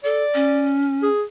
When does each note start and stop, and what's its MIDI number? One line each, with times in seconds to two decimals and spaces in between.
0.04 0.23 69
0.04 0.77 74
0.34 1.08 61
1.03 1.24 68